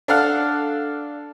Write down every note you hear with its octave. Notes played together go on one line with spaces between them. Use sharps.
D4 A4 F5 F#5